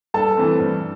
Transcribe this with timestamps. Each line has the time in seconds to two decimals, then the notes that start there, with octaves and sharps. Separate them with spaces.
0.14 G2 A4 A5
0.37 E3 A3 C4
0.59 G2